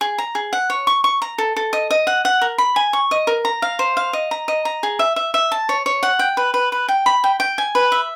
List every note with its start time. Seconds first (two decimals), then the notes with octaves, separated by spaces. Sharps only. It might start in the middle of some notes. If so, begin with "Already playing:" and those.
0.01 G#4
0.18 A#5
0.35 G#4
0.53 F#5
0.70 C#5
0.87 C#6
1.04 C#6
1.22 A#5
1.38 A4
1.56 A4
1.73 D#5
1.91 D#5
2.07 F#5
2.25 F#5
2.41 A#4
2.58 B5
2.76 G#5
2.93 C#6
3.11 D#5
3.27 A#4
3.45 A#5
3.62 F5
3.79 C5
3.97 F5
4.13 D#5
4.31 A#5
4.48 D#5
4.65 A#5
4.83 G#4
4.99 E5
5.16 E5
5.34 E5
5.52 A5
5.69 C#5
5.86 C#5
6.03 F#5
6.19 G5
6.37 B4
6.54 B4
6.72 B4
6.88 G5
7.06 B5
7.24 G5
7.40 G5
7.58 G#5
7.75 B4
7.92 E5